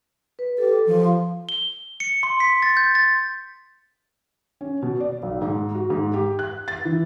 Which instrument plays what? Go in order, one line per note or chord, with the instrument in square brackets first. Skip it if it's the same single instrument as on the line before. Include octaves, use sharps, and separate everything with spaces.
[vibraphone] B4
[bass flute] G4 [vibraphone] A4
[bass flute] F3
[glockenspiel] G7
C#7
C6
B6
A6
G6
A6
[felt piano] C#4
B2
D5
B1
G#2
F#4
G#2
G4
F#6
A6
E3